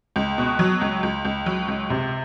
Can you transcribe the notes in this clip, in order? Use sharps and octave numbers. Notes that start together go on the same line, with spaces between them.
C#2
B2
F#3
C#2
C#2
C#2
F#3
C#2
C3